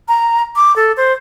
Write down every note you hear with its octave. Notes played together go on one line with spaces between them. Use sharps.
A#5
D6
A4
C5